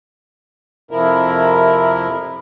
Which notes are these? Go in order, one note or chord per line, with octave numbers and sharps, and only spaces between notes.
F2 C3 F3 E4 A#4